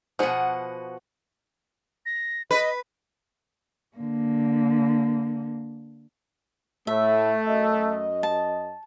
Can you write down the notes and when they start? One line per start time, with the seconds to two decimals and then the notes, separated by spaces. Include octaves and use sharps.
0.19 B2 F3 G#4 F#5
2.06 A#6
2.51 B4 D#5
3.96 D3 A#3
6.87 A2 A3 E5
7.45 F#2 D#5
8.23 A5